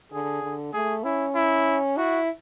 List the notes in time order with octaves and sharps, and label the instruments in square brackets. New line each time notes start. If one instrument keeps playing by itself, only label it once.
[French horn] D3 [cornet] G#4
[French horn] D3
[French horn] A3 [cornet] G#4
[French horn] C#4 [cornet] E4
[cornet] E4
[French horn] E4 [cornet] F#4